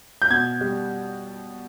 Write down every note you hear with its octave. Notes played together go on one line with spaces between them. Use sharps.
G6
B2 G#6
G3